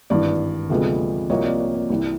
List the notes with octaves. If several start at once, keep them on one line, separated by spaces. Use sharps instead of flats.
G#1 G2 E3 D5
D2 C3 F3 G#3 B3
C2 C3 F3 A#3 C#5 D#5
D5
C#5
D5
C2 C3 E3